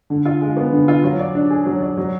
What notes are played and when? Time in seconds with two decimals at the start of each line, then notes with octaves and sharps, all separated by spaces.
0.10 D3
0.25 F4
0.41 G#3
0.57 B3
0.73 D3
0.88 F4
1.04 F#3
1.19 D5
1.35 D4
1.50 G#4
1.66 F#3
1.82 D5
1.97 F#3